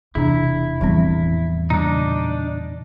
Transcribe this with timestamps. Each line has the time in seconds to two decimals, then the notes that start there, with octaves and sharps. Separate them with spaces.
0.15 E1 E2 C3 D4 E4 G#4
0.81 E2 A2 F3 G3 C4
1.70 A#2 C#3 G3 D4 D#4 A#5